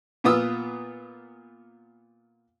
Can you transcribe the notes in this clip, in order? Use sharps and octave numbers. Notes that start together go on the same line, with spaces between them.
A#2 B3 F4 D#6 E6